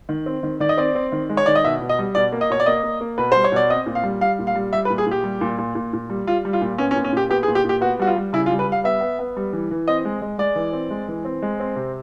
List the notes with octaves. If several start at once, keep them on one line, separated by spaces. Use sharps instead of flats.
D#3
C4
D#3
D#3 D5
D#5
C4 D5
C4
D#3
G#3
C#5
D#3 D5
D#5
B2 E5
B2
D#5
G3
B2 D5
A#3
D#5
B2 C#5
D5
A#3 D#5
A#3
A#3
B2 B4
G3 C5
C#5
B2 D5
C4 D#5
A#2
F5
G3
G3 F5
A#2
F5
G3
G3 E5
B4
A#2
G#4
A#2 G4
G3
A#2
A#2
A#2
A#2
G3
G3 F4
G3
F4
A#2
B3 C#4
C#4
A#2
C#4
A#2 G4
B3 G4
G#4
A#2
G4
A#2
G4
B3 F#4
G3 F#4
F4
G3
C#3 E4
F4
G3
B4
G3 F5
B3 E5
B3
B3
G3
E3
E3
C4 D#5
G#3
G#3
G#3 D5
E3
C4
G#3
E3
C4
G#3
C4
C3